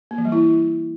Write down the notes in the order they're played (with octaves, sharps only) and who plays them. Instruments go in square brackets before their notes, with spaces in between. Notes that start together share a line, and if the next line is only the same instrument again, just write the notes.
[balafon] A#3
E3
G3
E4